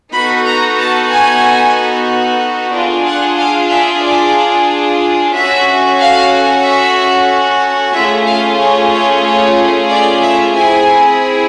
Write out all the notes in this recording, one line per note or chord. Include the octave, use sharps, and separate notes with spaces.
B3 D#4 F#4 A4 B5
A#5
A5
G#5
D4 F4 G#4
F#5
F5
E5
D5
C#4 F#4 A4 E5
F5
E5
A3 C#4 F4 G#4 E5
F5
C#5
C#5
C#5
D5
E5
C4 E4 G#4 G#5